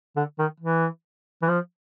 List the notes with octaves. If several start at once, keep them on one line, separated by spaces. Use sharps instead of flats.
D3
D#3
E3
E3
F3